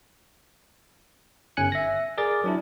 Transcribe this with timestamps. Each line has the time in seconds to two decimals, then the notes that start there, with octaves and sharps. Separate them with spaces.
1.57 G1 C#4 G#5 F#6 C#7
1.72 E5 A#6
2.18 G#4 A#4 D5 D6 A6
2.44 F#3 D4 E4